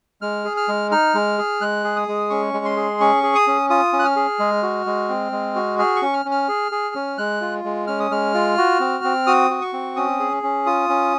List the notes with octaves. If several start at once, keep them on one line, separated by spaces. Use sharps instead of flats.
G#3 F6
G#4
F6
G#3
D#4 F6
G#3
G#4
G#3 F#6
G#4
D#6
G#3
C#4 C#6
G#3
C6
G#4
C#4 C#6
G#4
D#6
C#4
F4 D#6
C#4
F#6
F6
G#4
G#3
F#4
G#3
C4
G#3
F#4
G#4 F6
C#6
C#4
F6
C#4
F6
G#4
G#4
C#4
G#3 F#6
F4
G#3
C#4 F6
D#6
G#3 F6
F4
F#4
C4
C4
F#4 D#6
F#4
C#6
C4
C#4 D#6
G#4
C#4
F4 D#6
C#4